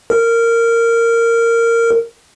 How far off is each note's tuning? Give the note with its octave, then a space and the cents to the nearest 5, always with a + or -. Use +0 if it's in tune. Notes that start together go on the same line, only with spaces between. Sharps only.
A#4 -15